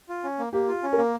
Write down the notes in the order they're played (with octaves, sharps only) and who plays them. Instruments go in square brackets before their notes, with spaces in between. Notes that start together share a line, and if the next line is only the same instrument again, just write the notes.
[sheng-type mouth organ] F4
C#4
A#3
[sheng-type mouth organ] A#3 [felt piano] G4
[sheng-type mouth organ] F4
C#4
[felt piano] A#4
[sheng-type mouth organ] A#3